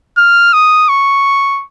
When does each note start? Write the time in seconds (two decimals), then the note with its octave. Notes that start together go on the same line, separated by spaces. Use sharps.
0.18 F6
0.54 D#6
0.89 C#6